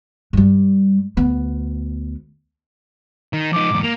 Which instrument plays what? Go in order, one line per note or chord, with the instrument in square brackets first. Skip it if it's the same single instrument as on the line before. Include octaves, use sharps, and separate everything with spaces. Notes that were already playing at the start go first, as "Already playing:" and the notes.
[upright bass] G2 G3
D2 B3
[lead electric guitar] D#3
[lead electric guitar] F3 D#4 [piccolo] D6
[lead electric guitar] E2 G#2
[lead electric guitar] A#3 [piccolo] F7